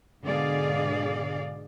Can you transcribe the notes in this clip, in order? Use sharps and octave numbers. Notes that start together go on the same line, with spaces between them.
G#2 B2 D3 G#4 D5 F5